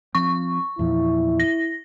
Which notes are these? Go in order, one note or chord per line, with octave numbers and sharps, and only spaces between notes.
F3 C4 C#6
E2 A#2 F3 E4
A#6